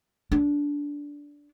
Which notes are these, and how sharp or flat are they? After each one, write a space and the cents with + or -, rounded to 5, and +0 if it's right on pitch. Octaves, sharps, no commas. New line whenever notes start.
D4 -15